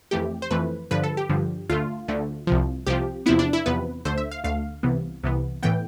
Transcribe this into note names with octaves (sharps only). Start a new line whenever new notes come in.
F2 E3 A3 G4
C5
F2 E3 A3 B4
G2 D3 F3 B4
A4
G4
G2 D3 F3
D2 D3 A3 F4
D2 D3 A3
C2 C3 F3
C2 C3 F3 G4
E2 C3 F3 B3 E4
D4
E4
E2 C3 F3 B3 B4
D2 D3 A3 C5
E5
F5
D2 D3 A3 F5
C2 C3 E3 B3
C2 C3 E3 B3
A2 E3 B3 G5